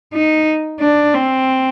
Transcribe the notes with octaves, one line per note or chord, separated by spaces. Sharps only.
D#4
D4
C4